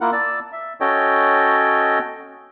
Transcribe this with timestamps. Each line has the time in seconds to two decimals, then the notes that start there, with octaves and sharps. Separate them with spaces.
0.01 A#3 E4 F4 A#4 F#5
0.12 D5 A5 E6
0.52 E5
0.80 C#4 F#4 A4 C#5 D#5 G5